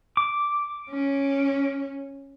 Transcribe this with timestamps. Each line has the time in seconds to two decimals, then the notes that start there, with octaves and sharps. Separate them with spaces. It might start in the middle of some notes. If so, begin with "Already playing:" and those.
0.17 D6
0.90 C#4